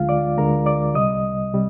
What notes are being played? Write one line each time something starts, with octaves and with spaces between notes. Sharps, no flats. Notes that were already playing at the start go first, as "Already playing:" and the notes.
Already playing: D2 D3 G#3 F4 F5
D5 D6
D2 D3 G#3 A#4 A#5
D5 D6
C2 C3 G3 D#5 D#6
C3 G3